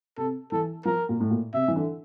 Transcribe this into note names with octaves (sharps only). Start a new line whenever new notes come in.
C3 A4
E3 A4
F3 A#4
A#2
A2
A#2
C3 E5
E3
D3